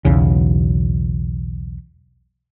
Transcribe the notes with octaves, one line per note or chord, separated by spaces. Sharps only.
B1 E2 C#3